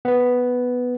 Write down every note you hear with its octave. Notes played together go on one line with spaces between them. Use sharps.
B3 B4